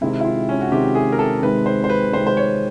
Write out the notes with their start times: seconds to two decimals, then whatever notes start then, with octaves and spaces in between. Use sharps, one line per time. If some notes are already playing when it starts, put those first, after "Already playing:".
0.01 C3 D#3 G#3 C4 E4
0.21 E4
0.25 F4
0.49 C#4
0.61 F#4
0.72 C3 D#3 G#3 C4 G4
0.95 G#4
1.12 A#4
1.19 A4
1.43 C3 D#3 G#3 C4 B4
1.66 C5
1.84 C5
1.90 B4
2.13 C3 D#3 G#3 C4 C5
2.27 C5
2.37 C#5